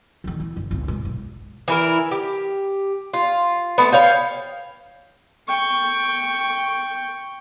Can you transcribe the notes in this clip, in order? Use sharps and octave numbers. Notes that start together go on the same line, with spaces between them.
D3 D#3
E3
G1 C#3
G#1 C#2
G#2
B1 G2
E3 E4 A#4
G4
F4
A3 B3
C#5 F5 G5
G5 C#6